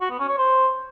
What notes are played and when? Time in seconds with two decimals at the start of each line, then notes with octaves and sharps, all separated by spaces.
0.01 F#4
0.10 B3
0.19 C#4
0.29 C#5
0.38 C5